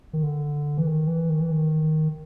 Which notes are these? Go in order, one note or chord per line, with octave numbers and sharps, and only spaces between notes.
D#3
D3
E3
D#3
E3
D#3
E3
D#3